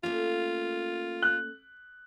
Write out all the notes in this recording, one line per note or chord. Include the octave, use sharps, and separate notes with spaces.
A3 A#3 C#4 F4
F#6